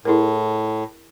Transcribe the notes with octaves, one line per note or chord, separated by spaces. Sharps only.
A2 E4 G#4 A#4